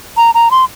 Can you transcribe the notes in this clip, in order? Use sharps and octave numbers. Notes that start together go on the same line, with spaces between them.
A#5
A#5
C6